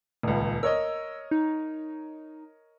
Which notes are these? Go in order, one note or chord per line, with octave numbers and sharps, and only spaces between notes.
D#1 C#2
A#4 C#5 D#5 E6
D#4